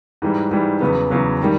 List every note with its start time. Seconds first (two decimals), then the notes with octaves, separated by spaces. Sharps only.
0.22 G#2 E3 G3
0.51 G#2 E3 G3
0.80 E2 C#3 F#3 B3
1.11 E2 C#3 F#3 B3
1.42 D#3 G3